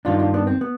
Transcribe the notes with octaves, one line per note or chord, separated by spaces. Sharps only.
G2 D#3 D4 F4
D4 F4
B3 D4
C4
B3